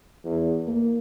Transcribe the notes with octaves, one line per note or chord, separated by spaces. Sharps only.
E2
A#3